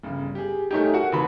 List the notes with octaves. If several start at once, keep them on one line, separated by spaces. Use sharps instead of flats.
G1 C#3
G4 G#4
A3 D#4 G4 A#4 C#5 G#5
F#4 F#5
D#2 E3 C4 B5